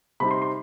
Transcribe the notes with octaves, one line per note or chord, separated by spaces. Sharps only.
C3 G3 C4 D#4 B5
C6
C6